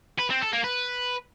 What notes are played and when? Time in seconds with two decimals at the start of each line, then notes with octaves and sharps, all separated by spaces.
0.19 B4
0.30 C4
0.41 A4
0.53 A#3
0.64 B4